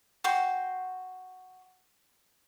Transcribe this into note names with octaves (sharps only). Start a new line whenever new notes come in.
F#4 G5 C6